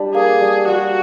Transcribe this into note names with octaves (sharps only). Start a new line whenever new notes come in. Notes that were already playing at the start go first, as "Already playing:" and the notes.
Already playing: G3 D4
A#3 G#4
G3
G3 F#4